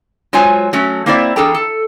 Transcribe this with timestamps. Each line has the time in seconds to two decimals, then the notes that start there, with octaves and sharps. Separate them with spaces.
0.33 F#3 G#3 F4 C5 C#5 G#5
0.73 F#3 A3 C#4
1.06 A#3 C4 E4 C5 D5 E5
1.36 E2 D4 G#4 A4 G5 A#5
1.55 A4